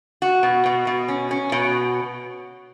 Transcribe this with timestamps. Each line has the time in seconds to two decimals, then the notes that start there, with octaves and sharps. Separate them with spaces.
0.22 F#4
0.43 B2
0.66 B2
0.87 B2
1.08 C#4
1.31 C#4
1.52 B2